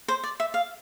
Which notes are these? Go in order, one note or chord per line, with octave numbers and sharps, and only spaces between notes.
C5
D5
E5
F5